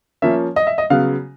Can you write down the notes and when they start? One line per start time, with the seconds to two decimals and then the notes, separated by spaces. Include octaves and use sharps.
0.22 F3 A#3 C#4 E5
0.56 D#5
0.67 E5
0.78 D#5
0.90 C#3 F#3 B3 F5